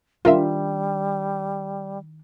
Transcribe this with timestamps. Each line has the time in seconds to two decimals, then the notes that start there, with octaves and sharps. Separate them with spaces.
0.25 D#3 G3 D4 F4 A#4 E5